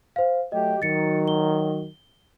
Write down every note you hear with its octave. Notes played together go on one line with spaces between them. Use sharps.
C5 F5
F#3 A3 G4 D#5
D#3 F#3 A6 C#7
G7